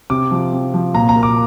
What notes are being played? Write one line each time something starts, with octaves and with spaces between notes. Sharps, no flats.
C3 D6
F3
C4
F3
A#2 A#5
A#5
A#3
D6